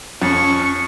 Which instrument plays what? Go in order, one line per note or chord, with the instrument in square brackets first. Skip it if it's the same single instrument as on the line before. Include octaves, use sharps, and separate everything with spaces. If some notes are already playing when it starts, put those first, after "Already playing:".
[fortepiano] F2 [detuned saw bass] C#4 [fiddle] C#6